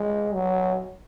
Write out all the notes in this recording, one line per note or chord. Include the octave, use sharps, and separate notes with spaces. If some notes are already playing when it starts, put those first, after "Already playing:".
Already playing: G#3
F#3